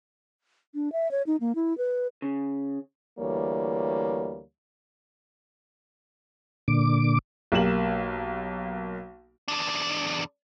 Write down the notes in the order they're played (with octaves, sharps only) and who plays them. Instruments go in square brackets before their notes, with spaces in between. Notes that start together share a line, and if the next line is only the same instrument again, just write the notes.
[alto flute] D4
E5
C#5
D#4
A#3
E4
B4
[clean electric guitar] C#3
[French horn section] D2 E3 G3 A#3 C#5
[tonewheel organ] A#2 D3 D6
[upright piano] B1 A#3 G4 E7 F#7
[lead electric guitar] E2 D4